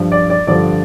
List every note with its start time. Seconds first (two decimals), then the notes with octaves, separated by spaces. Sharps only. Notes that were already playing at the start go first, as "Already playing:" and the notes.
Already playing: G2 F3
0.12 D5
0.30 D5
0.47 G2 D3 F3 D5